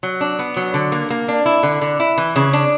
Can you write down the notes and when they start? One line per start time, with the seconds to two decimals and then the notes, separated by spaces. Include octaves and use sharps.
0.03 F#3
0.21 D4
0.39 B3
0.57 F#3
0.74 D3
0.92 A#3
1.10 A#3
1.28 D4
1.46 E4
1.63 D3
1.81 D3
2.00 E4
2.18 E3
2.36 C#3
2.53 D4